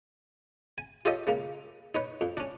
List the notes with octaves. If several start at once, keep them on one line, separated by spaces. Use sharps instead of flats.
G#5
F4 G4 A4 C#5 D#5 E5
C#3 A#3
D#4 B4 C#5
F2
C#4 D4